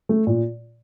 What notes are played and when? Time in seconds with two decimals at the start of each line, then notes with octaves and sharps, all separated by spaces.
0.09 A3
0.27 A#2